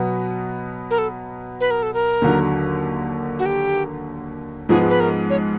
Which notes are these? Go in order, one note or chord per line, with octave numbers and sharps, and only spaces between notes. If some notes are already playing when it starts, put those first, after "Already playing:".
Already playing: B2 F#3 B3
A#4
A4
B4
A#4
A4
A#4
D#2 D3 F#3
F#4
G4
G#2 F3 G#3 B3 G#4
B4
A#4
C#5